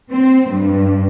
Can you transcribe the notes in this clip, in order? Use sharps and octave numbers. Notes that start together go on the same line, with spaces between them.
C4
G2